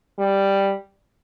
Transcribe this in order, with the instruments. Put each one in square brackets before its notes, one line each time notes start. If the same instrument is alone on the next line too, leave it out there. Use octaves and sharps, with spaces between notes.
[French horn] G3